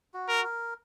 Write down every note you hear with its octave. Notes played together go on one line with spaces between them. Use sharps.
F#4
A#4
A#4